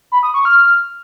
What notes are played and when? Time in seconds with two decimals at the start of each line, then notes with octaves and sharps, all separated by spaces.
0.12 B5
0.23 D#6
0.34 C#6
0.45 F6